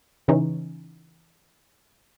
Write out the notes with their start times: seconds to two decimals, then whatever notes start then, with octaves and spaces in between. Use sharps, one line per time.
0.28 C#3 E3 C#4 D#4